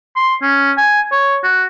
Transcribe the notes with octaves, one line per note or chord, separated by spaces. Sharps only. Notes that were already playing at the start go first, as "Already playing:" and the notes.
C6
C#4
G#5
C#5
F#4